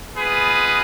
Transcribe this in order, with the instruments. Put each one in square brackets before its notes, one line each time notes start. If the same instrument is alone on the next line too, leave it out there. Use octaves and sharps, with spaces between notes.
[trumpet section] G#3 B3 F4 G#4 B4